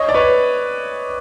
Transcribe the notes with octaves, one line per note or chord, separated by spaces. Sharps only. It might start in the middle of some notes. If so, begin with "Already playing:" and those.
Already playing: C#5 D#5
D5
B4 C#5